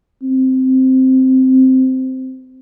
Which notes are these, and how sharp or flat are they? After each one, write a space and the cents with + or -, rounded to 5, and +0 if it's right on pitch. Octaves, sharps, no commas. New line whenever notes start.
C4 -5